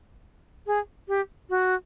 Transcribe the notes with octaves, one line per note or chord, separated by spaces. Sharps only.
G#4
G4
F#4